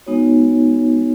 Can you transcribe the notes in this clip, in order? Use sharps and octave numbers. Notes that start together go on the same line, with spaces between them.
G#3 B3 D#4 F#4 C#5